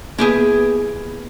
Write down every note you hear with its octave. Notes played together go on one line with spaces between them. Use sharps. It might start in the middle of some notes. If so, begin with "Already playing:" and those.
A#3 B3 E4 G4 G#4 B4